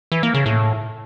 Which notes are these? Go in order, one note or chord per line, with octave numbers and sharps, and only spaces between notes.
E3
A#3
C#3
A2